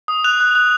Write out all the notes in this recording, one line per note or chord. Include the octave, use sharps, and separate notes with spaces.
D#6
F#6 F7
F#6
F#6